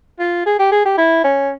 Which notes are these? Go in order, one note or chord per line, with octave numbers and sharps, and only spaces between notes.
F4
G#4
G4
G#4
G4
E4
C#4